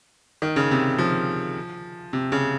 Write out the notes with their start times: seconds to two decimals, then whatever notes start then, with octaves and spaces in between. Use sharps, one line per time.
0.42 D#3
0.56 C#3
0.71 C3
0.98 F3
2.13 C3
2.32 C#3